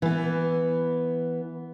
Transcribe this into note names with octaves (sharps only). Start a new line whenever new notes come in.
E3 B3